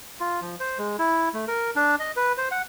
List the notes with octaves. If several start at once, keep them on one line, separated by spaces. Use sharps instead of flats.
F4
F3
C5
G#3
E4
A3
A#4
D4
D#5
B4
C5
F#5